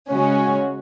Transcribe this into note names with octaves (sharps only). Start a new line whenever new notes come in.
C#3 G#3 C#4 F#4